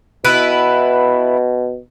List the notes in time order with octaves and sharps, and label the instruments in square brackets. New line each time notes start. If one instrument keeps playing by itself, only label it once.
[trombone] B2 [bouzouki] B3 E4 B4